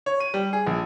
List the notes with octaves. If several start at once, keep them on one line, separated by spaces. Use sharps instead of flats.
C#5
D#7
G3
G#4
A#1